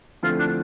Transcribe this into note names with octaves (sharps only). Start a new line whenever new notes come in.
D3 F3 A3 C4 E4 F4
D4